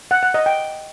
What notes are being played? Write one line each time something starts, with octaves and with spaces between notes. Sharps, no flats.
F#5
F#5
D#5
G5